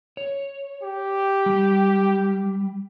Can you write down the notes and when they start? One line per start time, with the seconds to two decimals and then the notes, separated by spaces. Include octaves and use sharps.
0.17 C#5
0.83 G4
1.46 G3